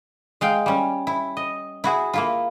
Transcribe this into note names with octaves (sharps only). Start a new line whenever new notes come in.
G#3 F5 G5
G3 C#4
E4
D#5
E4 F#4 G#4
A#3 E4 F4